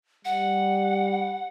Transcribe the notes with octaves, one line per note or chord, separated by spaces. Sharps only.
G3 F#5